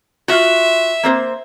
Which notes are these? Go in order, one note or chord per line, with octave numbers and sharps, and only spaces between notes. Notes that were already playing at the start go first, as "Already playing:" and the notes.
F4 F#4 E5
A#3 C4 C5